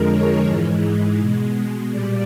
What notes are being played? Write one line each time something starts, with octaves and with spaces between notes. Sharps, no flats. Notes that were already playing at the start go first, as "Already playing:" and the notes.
Already playing: F2 D3 F3 G#3 A#4
C#5
G#2 E3 G#3
B2 G#3
A#2 G3 D5